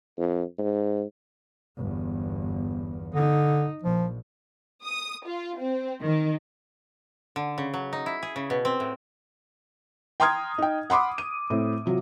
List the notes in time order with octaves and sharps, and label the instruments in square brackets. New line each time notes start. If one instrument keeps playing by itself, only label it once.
[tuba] F2
G#2
[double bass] G1 E2
[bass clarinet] D3 [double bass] D#4
[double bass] A#1 [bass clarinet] F3
[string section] D#6
F4
C4
D#3
[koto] D3
C#3
F#3
D#4
E4
G#4
C#3
B2
C4
A2
[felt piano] G5 A#5 C6 D#6 F6 G#6
D#4 G5
F#5 B5 C6 D6 D#6
D#7
A2 C4
C3 F#3 F4